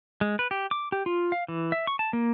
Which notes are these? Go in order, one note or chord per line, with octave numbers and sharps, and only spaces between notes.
G#3
B4
G4
D6
G4
F4
F5
E3
E5
C#6
A5
A#3